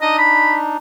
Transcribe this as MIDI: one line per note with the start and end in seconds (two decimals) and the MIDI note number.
0.01 0.77 62
0.01 0.77 63
0.01 0.15 75
0.19 0.55 83